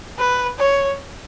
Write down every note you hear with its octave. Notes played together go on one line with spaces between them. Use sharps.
B4
C#5